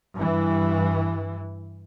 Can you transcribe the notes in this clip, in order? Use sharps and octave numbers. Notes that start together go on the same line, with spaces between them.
G2 E3